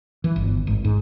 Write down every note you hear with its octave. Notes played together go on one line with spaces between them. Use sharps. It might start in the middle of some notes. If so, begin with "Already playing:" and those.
E3
G1
G#1
G#2